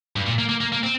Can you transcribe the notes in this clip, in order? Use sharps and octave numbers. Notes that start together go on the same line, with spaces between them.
G2
A#2
A#3
A#3
A#3
A#3
C4